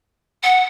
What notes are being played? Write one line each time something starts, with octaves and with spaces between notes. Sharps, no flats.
F#5